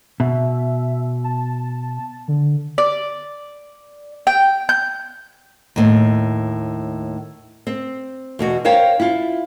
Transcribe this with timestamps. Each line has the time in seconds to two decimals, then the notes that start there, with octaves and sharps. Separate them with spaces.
0.20 B2 E5
1.24 A5
2.28 D3
2.78 D5
4.27 G5
4.69 G6
5.76 D#2 A2
7.67 C4
8.39 E2 B2 F#4
8.65 A#4 C5 C#5 F5 G5
9.00 E4 F4